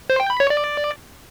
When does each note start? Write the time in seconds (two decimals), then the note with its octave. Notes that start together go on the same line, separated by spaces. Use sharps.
0.10 C5
0.20 G5
0.30 B5
0.40 C#5
0.50 D5